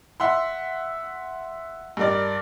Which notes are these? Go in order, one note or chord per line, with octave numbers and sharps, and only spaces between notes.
E5 F#5 C6
G2 A#4 D5